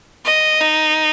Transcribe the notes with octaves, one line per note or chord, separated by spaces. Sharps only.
D#5
D#4